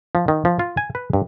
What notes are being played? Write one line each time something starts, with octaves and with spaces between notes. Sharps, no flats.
F3
D#3
F3
F4
G#5
B4
G2